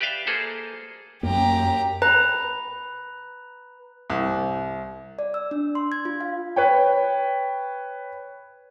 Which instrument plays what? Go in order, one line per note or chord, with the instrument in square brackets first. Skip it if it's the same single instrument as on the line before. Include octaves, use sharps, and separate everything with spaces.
[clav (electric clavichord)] G4 B4 D5 E5 F5 G5
A#3 G#4 A4 C5
[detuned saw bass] F#2 [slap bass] A#3 [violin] G4 A#5
[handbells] B4 A#5
[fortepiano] C2
[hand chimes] D5
E6
D4
C6
G#6
F4
F5
[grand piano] B4 C#5 G5